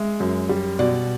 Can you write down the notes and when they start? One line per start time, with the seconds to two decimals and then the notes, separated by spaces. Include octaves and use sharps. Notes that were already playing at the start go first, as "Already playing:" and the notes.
Already playing: G#3 E5
0.20 F#2
0.49 G3
0.79 B2 D5